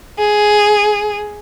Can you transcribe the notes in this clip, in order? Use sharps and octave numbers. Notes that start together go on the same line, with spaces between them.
G#4